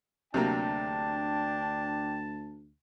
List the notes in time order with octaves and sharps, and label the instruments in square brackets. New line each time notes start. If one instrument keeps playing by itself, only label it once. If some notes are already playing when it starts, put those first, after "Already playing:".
[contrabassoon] D2 [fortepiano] C3 F#3 A#3 [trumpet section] D4 G5 [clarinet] A5